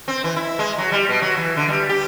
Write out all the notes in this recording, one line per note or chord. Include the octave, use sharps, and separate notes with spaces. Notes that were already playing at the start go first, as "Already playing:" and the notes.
C4
E3
E4
G#3
F#3
G3
B2
F#3
E3
D3
G3
G4